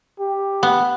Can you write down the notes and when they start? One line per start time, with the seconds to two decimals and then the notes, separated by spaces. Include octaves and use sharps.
0.20 G4
0.63 B3